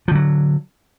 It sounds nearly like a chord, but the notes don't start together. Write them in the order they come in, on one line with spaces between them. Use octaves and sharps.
F3 D3 F#3